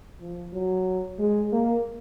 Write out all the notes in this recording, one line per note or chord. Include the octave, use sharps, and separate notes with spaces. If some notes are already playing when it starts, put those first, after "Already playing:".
F3
F#3
G#3
A#3